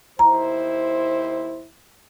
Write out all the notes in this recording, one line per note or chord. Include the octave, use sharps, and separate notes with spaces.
D#2 E4 C5 A#5